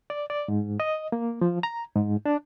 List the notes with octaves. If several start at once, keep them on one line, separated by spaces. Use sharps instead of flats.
D5
D5
G#2
D#5
A#3
F3
A#5
G#2
D4